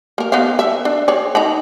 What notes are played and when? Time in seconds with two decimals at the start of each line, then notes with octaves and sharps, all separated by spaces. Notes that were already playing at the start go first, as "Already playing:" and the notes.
0.18 A#3 A#4
0.32 B3 D#4 F5
0.59 E5
0.85 D4
1.08 G#4 C#5 D5
1.35 D#4 A#5 B5